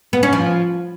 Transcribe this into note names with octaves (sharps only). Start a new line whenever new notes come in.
B3
C#4
F3